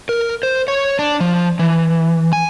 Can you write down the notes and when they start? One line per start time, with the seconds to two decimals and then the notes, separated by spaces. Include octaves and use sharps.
0.09 A#4
0.43 C5
0.68 C#5
0.99 D4
1.20 F3
1.59 E3
2.33 G#5